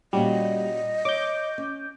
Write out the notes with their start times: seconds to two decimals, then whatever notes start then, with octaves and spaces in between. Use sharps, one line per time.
0.13 A#2 G3 C#4 F#4 D#5
1.05 C#5 D6 G6
1.58 C#4